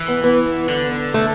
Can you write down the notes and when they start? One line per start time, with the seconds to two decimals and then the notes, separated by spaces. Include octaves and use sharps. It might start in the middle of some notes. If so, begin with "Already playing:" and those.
Already playing: E3
0.08 B3
0.24 B3
0.69 D3
1.14 A3